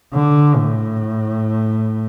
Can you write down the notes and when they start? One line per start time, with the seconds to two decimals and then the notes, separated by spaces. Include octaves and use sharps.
0.14 D3
0.56 A2